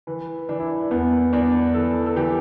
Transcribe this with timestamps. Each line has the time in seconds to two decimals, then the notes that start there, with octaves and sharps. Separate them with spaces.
0.07 E3 B4
0.49 E3 D4
0.60 E4
0.69 D4
0.91 E2 B3
1.33 E2 D4
1.74 E3 A4
2.06 A4
2.16 E3 G4